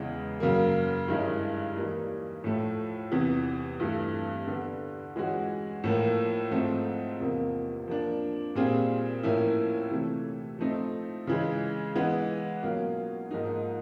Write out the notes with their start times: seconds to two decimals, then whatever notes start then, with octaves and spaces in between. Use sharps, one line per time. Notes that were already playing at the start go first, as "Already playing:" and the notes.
Already playing: E2 C#3 E3 G#3
0.40 F#2 C#3 F#3 A#3
1.08 G2 D#3 G#3 C#4 E4
1.76 E3 G3 A#3 D#4
2.44 A2 F3 A3
3.12 E2 C3 E3
3.80 G2 E3 A3
4.47 D3 G3 B3
5.16 E3 G#3 C#4 F#4
5.84 A2 F3 A#3
6.51 G#2 F3 A3 C4
7.20 E2 C3 F3 A#3
7.88 F3 A#3 D4
8.55 A#2 G3 C4 F4 G#4
9.23 A2 F3 A#3 C#4 E4
9.91 C3 E3 A3
10.59 F3 A3 C4 D#4
11.27 C#3 E3 G#3
11.95 E3 G#3 B3
12.63 B2 F#3 A#3 C#4 F4
13.31 G#2 F3 A#3 D#4